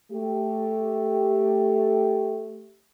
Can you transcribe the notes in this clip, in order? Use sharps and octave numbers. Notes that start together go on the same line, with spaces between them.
A3 G4